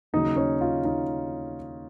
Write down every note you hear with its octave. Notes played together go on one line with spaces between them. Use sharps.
D#2 C#3 F#3 D#4
C#4
F4
D#4